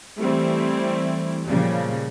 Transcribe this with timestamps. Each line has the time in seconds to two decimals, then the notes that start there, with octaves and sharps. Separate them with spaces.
0.21 E3 G3 A3 C4 E4
1.47 A#2 C#3 F3 G3